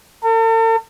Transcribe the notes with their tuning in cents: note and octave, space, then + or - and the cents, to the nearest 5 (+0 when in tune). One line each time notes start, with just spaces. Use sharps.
A4 +45